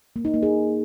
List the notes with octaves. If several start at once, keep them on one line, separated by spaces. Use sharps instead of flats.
A#3
D#4
A#3
G#4